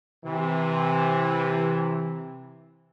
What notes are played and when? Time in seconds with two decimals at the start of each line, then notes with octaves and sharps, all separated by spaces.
0.25 C3 E3